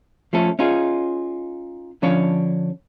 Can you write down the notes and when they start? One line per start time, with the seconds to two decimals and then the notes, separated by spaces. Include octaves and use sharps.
0.33 F3 A3 C#4 A4
0.59 C#4 D#4 F4 G#4
2.02 D3 F3 C#4 D4 C#5 F5